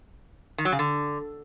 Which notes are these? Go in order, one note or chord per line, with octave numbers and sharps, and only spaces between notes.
D#3
F#3
C#3
D3